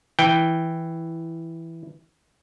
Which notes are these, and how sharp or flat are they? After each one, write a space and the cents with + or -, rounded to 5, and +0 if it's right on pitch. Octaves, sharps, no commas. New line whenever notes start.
E3 +0 G5 +0